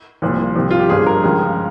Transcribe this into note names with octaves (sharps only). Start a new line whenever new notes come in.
C2 A#2 F3
C2 C3 F3
F4
G4
G1 G2 F3 G#4
A#4
C#2 C#3 F3